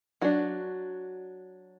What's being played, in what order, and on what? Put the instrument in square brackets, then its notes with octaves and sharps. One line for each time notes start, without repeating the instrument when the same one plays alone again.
[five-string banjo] F#3 D4 F#4